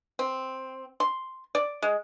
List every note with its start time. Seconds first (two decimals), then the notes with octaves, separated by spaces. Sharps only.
0.19 C4
1.00 C6
1.55 D5
1.82 G#3